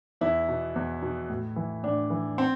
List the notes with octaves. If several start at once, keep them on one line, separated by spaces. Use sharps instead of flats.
E2 E4
B2
E2
B2
A2
E3
A2 D4
E3
C4